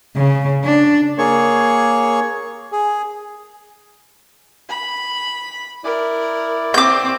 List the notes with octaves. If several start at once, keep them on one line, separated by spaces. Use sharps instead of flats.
C#3
D4
A#3 G#4 C#5 C#6
G#4
B5
E4 A#4 D5
C4 D6 G6